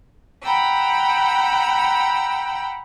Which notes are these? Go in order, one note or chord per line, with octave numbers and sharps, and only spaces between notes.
F#5 G5 A#5 B5 E6